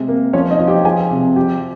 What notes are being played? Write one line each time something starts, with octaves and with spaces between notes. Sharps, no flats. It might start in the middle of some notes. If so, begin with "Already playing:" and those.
Already playing: C3 G#3
A#3
F3 C#4 C#5
D#4 D#5
F3
G4 G5
F3 G#4 G#5
C3
F3 G4 G5